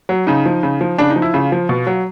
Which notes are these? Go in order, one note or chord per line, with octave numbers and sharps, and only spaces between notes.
F#3
C#3 D#4
F3
C#3
F3
C#3 D4
D#4
F3
E4
C#3 F4
F3
B2
F#3